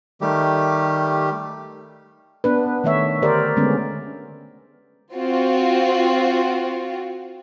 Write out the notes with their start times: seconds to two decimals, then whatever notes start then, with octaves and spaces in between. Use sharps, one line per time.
0.21 D#3 G3 A3 G4
2.44 B3 D4 B4
2.84 D#3 A3 C#5 E5
3.22 D3 G4 A#4 C5 D5
3.57 D3 G#3 A3 B3 C#4
5.14 C4 F4 F#4